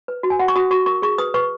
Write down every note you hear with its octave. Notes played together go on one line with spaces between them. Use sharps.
B4
F#4
G#5
F#4 F#5
C#6
F#4 D#6
F#4 C#6
A#4 C#6
G#4 C#6
B4 D#6
B4 C#6